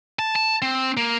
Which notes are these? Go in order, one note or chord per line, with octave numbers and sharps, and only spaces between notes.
A5
A5
C4
A#3